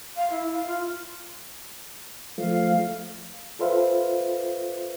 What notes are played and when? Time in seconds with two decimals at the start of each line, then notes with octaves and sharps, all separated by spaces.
0.16 F5
0.30 E4
0.53 F5
0.66 F4
2.38 F3 A3 F5
3.59 F4 A4 B4 C5 E5 F5